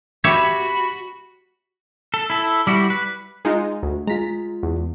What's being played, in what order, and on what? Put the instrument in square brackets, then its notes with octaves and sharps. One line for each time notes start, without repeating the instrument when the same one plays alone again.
[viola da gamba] F#4 [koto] G4 C#5 E5 [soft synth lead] B5
[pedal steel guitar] A4
E4 A4
G3 E4 F#4
B4
[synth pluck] G#3 D#4 F4
D2
[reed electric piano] G#3 F4 [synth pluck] A#5 B6
[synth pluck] E2